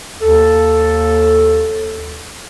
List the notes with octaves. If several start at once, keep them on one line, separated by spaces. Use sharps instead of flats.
D#2 A4